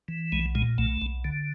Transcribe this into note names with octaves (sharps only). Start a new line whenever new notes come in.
E3
B1 G#3
A#2 G#3
B1 A3
B1
D3